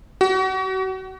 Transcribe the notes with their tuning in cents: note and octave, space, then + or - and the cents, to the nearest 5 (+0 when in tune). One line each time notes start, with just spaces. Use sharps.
F#4 +35